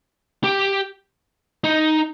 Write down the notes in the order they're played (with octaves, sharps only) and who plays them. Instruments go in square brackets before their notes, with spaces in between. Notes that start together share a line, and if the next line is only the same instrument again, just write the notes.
[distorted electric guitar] G4
D#4